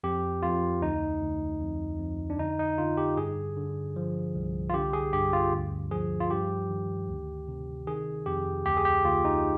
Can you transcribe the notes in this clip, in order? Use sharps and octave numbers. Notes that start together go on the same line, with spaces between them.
F2 G4
F2 F4
D2 D#4
D2
F2
F2
D4
D3 D#4
D#4
D3 F4
G4
G2 G#4
D3
F3
C2
F4
D3 G4
G#4
G2 G4
F4
D2
F3 G#4
F4
G2 G4
D#3
D2
C3
D#3 G#4
F2 G4
D2 G4
G#4
G4
D2 F4
D#4